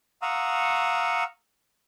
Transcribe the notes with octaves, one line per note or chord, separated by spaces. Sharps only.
F5 F#5 A#5 C#6 D#6 E6